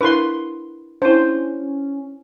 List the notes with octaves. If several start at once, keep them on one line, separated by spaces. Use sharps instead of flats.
D4 E4 A#4 B4 C6
C#4 D4 E4 C5